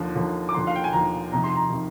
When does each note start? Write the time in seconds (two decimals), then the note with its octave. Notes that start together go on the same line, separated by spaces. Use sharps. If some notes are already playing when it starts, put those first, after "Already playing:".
Already playing: D#2 D3 F3
0.15 D#2 D3 F3
0.49 D6
0.54 D#2 D3 F3 C6
0.67 F5
0.76 G5
0.84 G#5
0.93 D#2 D3 F3 A#5
1.32 F2 C3 D#3 A#5
1.44 C6
1.56 A#5
1.70 C3 D#3